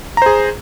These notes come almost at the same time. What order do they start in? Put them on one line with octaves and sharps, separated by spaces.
A#5 C5 G#4